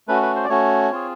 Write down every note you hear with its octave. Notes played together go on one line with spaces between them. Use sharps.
A3 C#4 F#4 B4
B4
C5
D5
A3 C#4 F#4 C#5
C4 F4 G#4